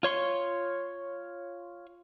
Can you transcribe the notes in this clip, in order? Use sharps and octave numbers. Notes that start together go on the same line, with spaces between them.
F4 C#5 C6 C#6